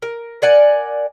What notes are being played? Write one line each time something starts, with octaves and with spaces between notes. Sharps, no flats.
A#4
A#4 D5 F#5 G#5